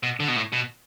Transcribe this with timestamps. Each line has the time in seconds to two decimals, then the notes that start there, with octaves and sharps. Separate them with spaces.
0.03 B2
0.20 D3
0.28 B2
0.36 A2
0.53 B2